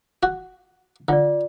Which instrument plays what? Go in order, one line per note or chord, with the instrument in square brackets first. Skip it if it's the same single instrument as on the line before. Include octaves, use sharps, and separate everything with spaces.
[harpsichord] F#4
[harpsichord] D3 [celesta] F4 D5